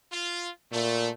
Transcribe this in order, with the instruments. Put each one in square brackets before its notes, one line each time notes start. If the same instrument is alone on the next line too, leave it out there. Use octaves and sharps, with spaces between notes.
[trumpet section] F4
[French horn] A#2 [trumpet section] A3